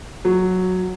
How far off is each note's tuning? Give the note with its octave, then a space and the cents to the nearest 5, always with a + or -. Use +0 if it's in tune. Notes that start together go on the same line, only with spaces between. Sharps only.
F#3 -5